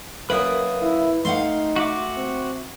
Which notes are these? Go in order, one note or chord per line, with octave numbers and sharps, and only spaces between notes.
F#2 A#3 B4 E5 D#6
E4
A3 D#4 F5 F#5 C6
F#4 E5 D6
C4